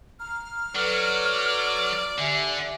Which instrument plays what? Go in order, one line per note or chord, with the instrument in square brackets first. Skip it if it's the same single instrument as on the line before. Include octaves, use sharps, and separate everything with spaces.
[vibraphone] A#5 [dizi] F6
[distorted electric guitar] F#3 [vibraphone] A4 B4 [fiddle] D5
[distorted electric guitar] D3 [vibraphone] G4 E5 G#5